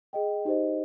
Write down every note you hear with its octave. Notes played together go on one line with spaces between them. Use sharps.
G#4 D#5 G5
D#4 G4 C5 D#5